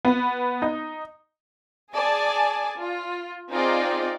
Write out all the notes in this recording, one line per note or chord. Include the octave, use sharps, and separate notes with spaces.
B3
D#4
G#4 D5 G#5 A5
F4
C4 D#4 F4 G#4 D5